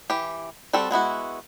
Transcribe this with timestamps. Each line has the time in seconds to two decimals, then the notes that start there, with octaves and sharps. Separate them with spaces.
0.10 E3 G4
0.73 G3 C4 F#4 A4
0.91 G#3 B3 E4 F#4